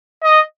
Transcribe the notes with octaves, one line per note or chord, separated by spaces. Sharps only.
D#5